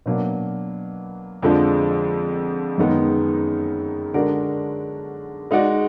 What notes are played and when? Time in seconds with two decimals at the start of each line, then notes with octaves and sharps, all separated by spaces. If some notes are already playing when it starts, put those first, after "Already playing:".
0.06 B2 F#3 A#3 D4
1.43 F2 D3 F3 G#3 D4
2.78 F#2 D#3 G#3 B3 D#4
4.14 D3 G#3 D4 F#4 A#4
5.51 G#3 D#4 F#4 D5